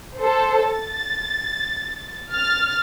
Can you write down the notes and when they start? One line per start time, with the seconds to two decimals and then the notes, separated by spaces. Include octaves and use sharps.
0.19 A4 C5
0.72 A6
2.32 F6 A6